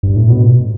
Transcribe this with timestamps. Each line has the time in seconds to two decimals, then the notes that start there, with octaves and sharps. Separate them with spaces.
0.03 G2
0.16 A2
0.28 B2